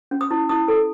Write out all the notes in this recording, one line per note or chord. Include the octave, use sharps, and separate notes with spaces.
C#4
D#6
E4
E4 D#6
A4